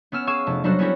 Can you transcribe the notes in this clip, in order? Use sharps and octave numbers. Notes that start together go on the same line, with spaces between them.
B3 C#4 E6 F6 E7
G#4 F5 C#6 E6 G#6 E7
F1 A5
F#3 G3 D4 F#4 A4 C5
B3 C#4 E4 F#4 G4 A4